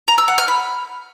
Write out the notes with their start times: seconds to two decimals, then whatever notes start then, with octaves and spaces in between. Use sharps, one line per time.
0.08 A#5
0.18 E6
0.28 F#5
0.38 F6
0.48 B5